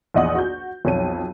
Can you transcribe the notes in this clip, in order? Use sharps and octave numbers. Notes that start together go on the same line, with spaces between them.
A#1 E2 D#5 F#5 D#6
F#4 G6
B1 F2 C#5 D#7